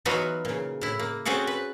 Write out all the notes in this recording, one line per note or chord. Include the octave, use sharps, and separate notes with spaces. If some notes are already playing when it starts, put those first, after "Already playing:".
E3 F#3 B3 D#4 F4 F#4
A#2 C#3
A2 E4
A#3
C4 C#4 F#4 G#4 A4
B4